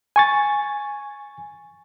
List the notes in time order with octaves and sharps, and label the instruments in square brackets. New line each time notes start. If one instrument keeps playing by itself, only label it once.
[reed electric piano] G#5 C#6 A6